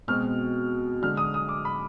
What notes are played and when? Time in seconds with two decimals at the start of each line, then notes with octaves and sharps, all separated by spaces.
0.08 B2 G#3 C4 F6
1.02 D3 G#3 D4 F6
1.17 D#6
1.34 D#6
1.49 D6
1.65 B5